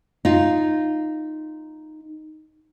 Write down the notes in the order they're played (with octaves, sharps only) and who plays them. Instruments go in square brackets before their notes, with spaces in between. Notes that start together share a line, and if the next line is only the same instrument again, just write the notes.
[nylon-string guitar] D#4 F4